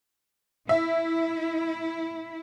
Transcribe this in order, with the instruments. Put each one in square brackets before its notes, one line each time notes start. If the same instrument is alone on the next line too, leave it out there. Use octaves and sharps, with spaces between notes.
[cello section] E4 [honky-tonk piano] E5